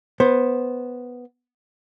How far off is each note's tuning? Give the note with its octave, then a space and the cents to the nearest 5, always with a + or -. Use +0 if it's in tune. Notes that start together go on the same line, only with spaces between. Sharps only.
B3 +0 C5 +15